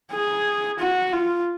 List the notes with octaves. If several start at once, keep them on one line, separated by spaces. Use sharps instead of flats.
G#4
F#4
F4